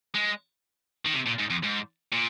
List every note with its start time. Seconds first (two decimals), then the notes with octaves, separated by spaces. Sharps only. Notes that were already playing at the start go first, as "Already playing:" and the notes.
0.14 G#3
1.05 D#3
1.14 C3
1.26 A#2
1.39 G#2
1.50 F2
1.64 G#2
2.13 A#2